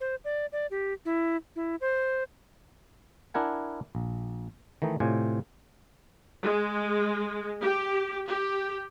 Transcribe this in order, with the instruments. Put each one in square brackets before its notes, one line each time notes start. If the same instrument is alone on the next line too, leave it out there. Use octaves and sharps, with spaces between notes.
[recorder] C5
D5
D5
G4
E4
E4
C5
[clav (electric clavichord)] D4 E4 A#4 F#5 G#5
A#1
D#3 E3 A3 D#4
A2 C3 F4 D5 G#5
[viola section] G#3
G4
G4